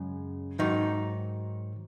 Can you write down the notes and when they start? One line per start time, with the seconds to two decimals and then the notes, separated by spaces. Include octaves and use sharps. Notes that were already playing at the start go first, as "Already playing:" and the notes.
Already playing: F#2 C#3 G#3
0.59 G#2 D#3 F#3 D#4